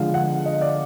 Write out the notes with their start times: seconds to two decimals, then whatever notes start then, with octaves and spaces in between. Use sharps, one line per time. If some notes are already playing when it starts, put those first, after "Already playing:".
Already playing: D3 F3 G#3 F5
0.14 F#5
0.46 D#5
0.61 D5